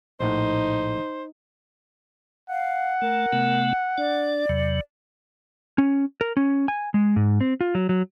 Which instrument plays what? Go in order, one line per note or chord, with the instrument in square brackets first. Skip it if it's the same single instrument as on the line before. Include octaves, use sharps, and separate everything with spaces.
[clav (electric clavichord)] A#1 A2 F#5 [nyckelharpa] D#4 [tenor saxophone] C5
[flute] F5 [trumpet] F#5
[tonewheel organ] A3 [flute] A#4
[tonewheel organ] C3 A3 B3
[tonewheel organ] D4 [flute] D5
[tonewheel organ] E2 C3 F#3
[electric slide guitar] C#4
A#4
C#4
G#5
G#3
G#2
C4
F4
F#3
F#3